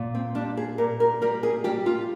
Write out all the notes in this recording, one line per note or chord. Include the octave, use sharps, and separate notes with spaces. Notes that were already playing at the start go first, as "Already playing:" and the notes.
Already playing: A#2
C4
G3 D4
G#4
A#2 A#4
A#4
G3 A#4
G#4
G3 G4
F4